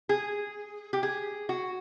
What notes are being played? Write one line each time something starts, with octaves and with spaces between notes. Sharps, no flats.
G#4
G4
G#4
F#4